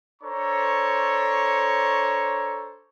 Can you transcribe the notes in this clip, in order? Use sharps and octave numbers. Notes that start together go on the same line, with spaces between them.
D4 A4 C5 C#5 A#5 C#6